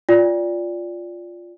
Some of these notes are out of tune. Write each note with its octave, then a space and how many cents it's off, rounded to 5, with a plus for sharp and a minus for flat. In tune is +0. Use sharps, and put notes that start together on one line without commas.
F4 +0 D5 -10 G5 +45